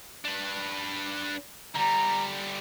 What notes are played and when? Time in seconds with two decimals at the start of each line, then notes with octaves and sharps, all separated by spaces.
0.25 D4 B4
1.76 D3 G3 A#5